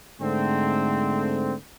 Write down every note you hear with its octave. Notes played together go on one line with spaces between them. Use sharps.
G#2 D3 A3 C4